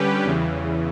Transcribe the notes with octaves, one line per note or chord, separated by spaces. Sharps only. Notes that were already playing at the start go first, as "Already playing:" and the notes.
Already playing: D3 G3 C#4 G4 B4
E2 C#3 E3